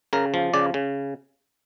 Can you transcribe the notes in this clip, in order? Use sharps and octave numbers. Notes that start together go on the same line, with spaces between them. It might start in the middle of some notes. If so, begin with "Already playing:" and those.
C#3 A#4
F3
C#3 D5
C#3